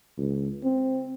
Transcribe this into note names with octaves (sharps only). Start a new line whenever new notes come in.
C#2
C4